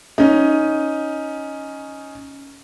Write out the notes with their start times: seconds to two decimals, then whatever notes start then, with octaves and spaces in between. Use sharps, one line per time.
0.18 C#4 D#4